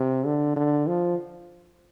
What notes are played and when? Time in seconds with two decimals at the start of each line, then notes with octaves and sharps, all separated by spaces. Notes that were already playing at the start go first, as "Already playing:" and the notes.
Already playing: C3
0.26 D3
0.56 D3
0.87 F3